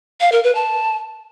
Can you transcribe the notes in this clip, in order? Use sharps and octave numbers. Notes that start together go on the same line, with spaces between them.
F5
A#4
B4
A5